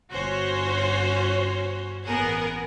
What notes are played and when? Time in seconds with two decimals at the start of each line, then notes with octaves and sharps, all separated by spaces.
0.11 G1 C#4 F#4 C5 C#5
2.07 A1 B3 G#4 A#4 F#5